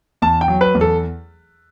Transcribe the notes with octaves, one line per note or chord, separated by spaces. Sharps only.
E2 A5
G5
F#3
B4
E2
A4